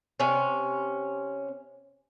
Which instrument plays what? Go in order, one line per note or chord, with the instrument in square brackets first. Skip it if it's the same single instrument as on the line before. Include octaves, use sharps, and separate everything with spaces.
[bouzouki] C3 C#4